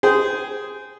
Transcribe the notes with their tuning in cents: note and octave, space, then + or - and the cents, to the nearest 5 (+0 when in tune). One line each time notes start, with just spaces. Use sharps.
G#4 +0 C5 -20 G5 +0